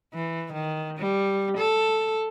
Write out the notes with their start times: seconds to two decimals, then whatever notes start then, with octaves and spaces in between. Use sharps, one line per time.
0.14 E3
0.53 D#3
0.98 G3
1.57 A4